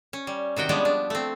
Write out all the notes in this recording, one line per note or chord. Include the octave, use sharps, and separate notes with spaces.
C#4
G3
C3 D#3 F#4 G5
F3 G3 G#3 B3 C#4 D4
D4
A3 C4